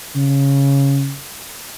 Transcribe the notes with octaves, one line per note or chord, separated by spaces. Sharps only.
C#3